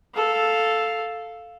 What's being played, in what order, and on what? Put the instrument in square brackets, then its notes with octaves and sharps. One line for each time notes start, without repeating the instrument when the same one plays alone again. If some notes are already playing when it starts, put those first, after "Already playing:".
[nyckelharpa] A4 F5